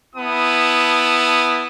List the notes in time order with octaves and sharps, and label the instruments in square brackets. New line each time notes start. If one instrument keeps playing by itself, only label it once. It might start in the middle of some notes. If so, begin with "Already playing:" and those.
[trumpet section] B3 E4 A5 D#6